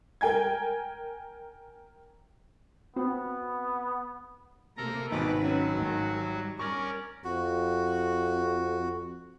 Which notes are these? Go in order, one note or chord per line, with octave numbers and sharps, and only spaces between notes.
A#4 G5 G#5 G#6
B3 C4 F#4
C3 A#3 A4 A#4 A#5
G#1 B2 B4 D6
F#3 C#4 F#4
G#2 D#3
G3
C#4 A#4 D5 C#6
F2 F#4